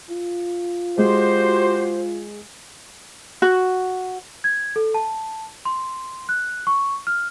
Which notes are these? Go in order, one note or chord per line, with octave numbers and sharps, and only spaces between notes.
F4
G#3 F#4 G4 C5
F#4
G#6
A4
A5
C6
F#6
C#6
F6